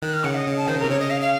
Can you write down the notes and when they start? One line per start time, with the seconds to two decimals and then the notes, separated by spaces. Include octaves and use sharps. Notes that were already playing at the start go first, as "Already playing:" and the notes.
0.02 D#3 F#6
0.13 F6
0.24 C#3 F#5
0.35 D#5
0.46 C#3
0.57 A5
0.67 D#3 C5
0.75 C#3
0.79 C3 A#4
0.90 C#3 C#5
1.00 D#5
1.10 F5
1.21 F5